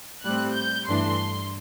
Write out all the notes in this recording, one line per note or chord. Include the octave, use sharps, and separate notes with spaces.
A2 G3 C4 F#6
G6
G2 E3 A3 D4 C6